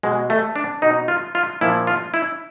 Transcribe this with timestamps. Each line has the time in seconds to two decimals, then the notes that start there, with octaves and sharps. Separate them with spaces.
0.03 B2 G#3
0.30 A3
0.56 D4
0.82 B2 D#4
1.08 F4
1.35 F4
1.61 A#2 F3 E4
1.87 F4
2.14 E4